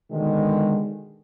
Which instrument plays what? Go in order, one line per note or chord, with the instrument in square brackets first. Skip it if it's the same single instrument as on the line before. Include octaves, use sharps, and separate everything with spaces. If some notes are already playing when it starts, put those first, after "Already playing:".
[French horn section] B2 D3 D#3 G#3